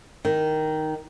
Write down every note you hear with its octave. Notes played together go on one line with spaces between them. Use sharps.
D#3